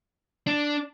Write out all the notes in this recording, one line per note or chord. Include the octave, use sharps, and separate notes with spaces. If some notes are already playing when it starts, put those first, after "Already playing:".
D4